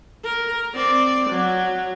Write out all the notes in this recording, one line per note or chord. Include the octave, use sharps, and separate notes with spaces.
A#4
C4 D5
F#3